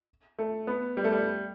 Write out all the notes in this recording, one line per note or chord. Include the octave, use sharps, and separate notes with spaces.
A3
B3
G3
A3
G3